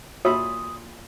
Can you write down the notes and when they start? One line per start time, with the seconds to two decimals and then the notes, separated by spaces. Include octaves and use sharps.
0.25 A#2 F#4 C#5 E5 B5 D#6